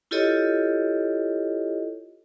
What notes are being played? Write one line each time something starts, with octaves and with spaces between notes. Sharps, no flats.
E4 F4 G4 A4 C#5 D#5